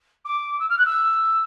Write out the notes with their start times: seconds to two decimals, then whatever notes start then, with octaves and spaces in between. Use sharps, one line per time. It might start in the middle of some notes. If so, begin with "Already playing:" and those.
0.25 D6
0.59 E6
0.69 F6
0.78 F#6
0.85 E6